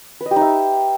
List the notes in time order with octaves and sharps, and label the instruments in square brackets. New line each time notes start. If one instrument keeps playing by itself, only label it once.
[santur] B4
D#5
G4
D#4
E5